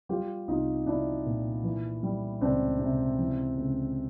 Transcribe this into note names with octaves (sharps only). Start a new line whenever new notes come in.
G3 F4 G4
C2 D#4 F4
C2 D4 E4
A#2
E3
G3
C#2 C4 D4
C3
E3
C#2